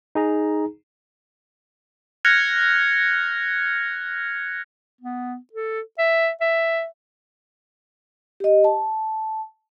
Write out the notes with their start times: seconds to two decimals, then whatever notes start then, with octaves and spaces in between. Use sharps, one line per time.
0.15 D#4 G#4 A#5
2.25 F6 F#6 G#6 A#6 C#7 F7
5.01 B3
5.53 A4
5.98 E5
6.41 E5
8.40 G4 D#5
8.64 A5